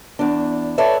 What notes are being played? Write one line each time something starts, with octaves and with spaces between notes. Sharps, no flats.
E2 D4
A4 B4 C#5 D5 E5